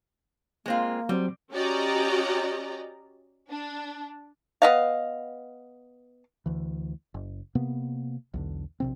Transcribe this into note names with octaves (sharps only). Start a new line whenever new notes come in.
G#3 A#3 C4 F4
F#3 G3 C4 C5
C#4 F#4 G4 D5 D#5 A#5
D4
B3 D#5 F5
D2 E3
F#1
C3 A#3 B3
B1 E2 D3
A#1 C3 C4